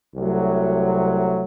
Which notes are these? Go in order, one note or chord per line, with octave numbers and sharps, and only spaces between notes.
C2 C3 F#3 A3